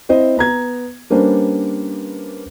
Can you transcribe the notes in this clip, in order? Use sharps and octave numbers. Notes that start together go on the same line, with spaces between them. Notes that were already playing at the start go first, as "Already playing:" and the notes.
C4 E4 C5 D#5
B3 A#5 G#6
G3 A#3 C#4 D4 B4 C5